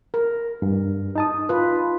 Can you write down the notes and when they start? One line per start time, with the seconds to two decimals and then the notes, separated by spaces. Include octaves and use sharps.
0.14 A#4
0.62 G2
1.16 D#4 A5 D#6
1.49 F4 B4